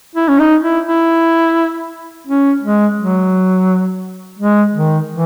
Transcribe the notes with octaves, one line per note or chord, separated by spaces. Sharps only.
E4
C#4
D#4
E4
E4
C#4
G#3
F#3
G#3
D#3
E3